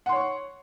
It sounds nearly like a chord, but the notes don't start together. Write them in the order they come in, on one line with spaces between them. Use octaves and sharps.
F#5 C6 C#5 C#6